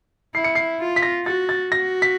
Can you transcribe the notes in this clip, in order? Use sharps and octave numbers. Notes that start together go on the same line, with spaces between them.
E4 C7
C#7
C7
F4
B6
A#6
F#4 A6
A6
F#4 A#6
B6